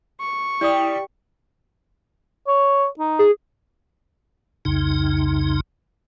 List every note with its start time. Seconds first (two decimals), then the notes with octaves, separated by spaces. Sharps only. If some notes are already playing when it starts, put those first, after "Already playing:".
0.21 C#6
0.61 G3 E4 D5 D#6
2.48 C#5
2.99 D#4
3.19 G#4
4.65 C2 F2 C#3 D#4